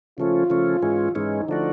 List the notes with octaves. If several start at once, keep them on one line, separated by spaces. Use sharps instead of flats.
C#3 F3 A3 C#4 F4
C#3 F3 A3 C#4
G#2 E3 G#3 C#4
G#2 E3 G#3 C#4 D#4
D3 F3 A3 D4 F#4